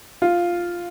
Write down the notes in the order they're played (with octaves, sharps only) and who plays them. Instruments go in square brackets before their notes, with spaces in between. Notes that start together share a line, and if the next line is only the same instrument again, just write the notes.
[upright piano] F4